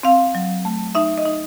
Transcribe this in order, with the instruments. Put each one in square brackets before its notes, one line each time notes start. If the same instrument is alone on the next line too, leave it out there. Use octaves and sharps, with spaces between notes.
[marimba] C4 F5
F#3
A3
D#4 E5
D#5
D#4